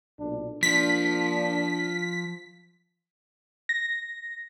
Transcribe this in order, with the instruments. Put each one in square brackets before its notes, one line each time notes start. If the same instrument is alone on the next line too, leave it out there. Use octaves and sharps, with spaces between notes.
[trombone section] B1 A#2 D4
[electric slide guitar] F3 [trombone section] A#3 D4 [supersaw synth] B6
[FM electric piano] A#6